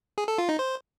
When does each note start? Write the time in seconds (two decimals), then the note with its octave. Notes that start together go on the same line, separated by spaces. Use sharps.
0.18 G#4
0.28 A4
0.38 F4
0.49 D#4
0.59 C5